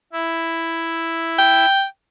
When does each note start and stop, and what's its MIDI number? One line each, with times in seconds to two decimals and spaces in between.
0.13 1.66 64
1.39 1.84 79